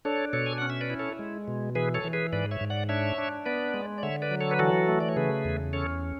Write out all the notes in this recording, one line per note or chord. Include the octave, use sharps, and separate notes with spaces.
D4 A4 C#5
B2 A4 C#5
G#5
C#4 F#5
E5
B4 D5
E4
A4 C#5
G#3
B2
E3 G#4 B4
A4 C#5
E3
G#4 B4
G#2 B4 D5
C#5 E5
G#2
D5 F#5
D4 C#5 E5
D4
B3 B4 D5
G#3
D5
D3 C#5 E5
B4 D5
F#3
A4 C#5
B4
E3 F#4 A4
A3
D5
C#5
C#3 G#4 B4
E2
C#4 A4 C#5